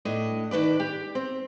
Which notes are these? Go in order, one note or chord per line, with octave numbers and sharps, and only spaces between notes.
A2 D4 D#5
D#3 D4 B4 D5
G4
C4